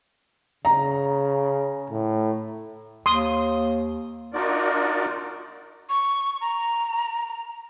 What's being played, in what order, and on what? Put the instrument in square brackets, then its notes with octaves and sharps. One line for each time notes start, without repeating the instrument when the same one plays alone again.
[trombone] C#3 [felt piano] A#5
[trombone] A2
[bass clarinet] D#2 [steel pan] C6 D#6
[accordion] D4 D#4 F4 F#4 A#4 D5
[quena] C#6
A#5